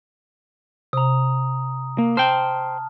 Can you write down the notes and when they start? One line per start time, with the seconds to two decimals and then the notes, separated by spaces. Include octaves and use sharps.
0.93 C3 A#5 D#6
1.98 A#3
2.17 C5 G5 A5 F6